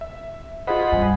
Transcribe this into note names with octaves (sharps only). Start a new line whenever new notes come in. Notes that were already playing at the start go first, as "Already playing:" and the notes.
E5
F4 G#4 C5 D#5 F#5 B5
G2 G#5